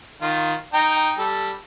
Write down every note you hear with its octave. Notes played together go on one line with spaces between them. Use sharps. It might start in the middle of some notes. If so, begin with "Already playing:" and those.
D#3 F4
D#4 G5 A#5
G3 A4